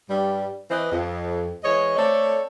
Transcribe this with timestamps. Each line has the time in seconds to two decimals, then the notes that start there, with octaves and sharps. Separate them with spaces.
0.10 G2 G3
0.71 E3 C4 B4 D#5
0.92 F2
1.64 E3 G#3 C#5 D#5
1.96 A3 C4 A4 C#5 D5